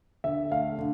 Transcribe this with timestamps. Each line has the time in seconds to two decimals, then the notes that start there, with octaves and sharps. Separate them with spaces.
0.24 D3 E5
0.51 A3 F5
0.78 D3